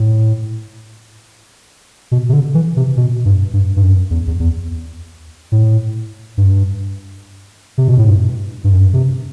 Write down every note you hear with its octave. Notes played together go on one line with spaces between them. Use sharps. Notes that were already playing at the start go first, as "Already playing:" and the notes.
Already playing: A2
B2
C3
D3
E3
C3
B2
G2
G2
G2
F#2
E2
E2
E2
A2
G2
C3
B2
A2
G2
G2
F#2
G2
C3